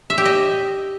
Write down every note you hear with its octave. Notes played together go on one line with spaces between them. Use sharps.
E5
G4
D#5